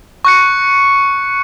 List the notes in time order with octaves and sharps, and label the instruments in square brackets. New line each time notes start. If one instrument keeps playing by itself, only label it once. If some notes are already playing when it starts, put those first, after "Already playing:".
[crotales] C#6 F#6 C#7